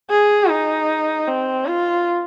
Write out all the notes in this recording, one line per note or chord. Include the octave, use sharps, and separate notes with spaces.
G#4
D#4
C4
F4